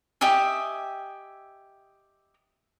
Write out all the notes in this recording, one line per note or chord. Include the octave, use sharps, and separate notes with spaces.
G4 D#5 E5 G#5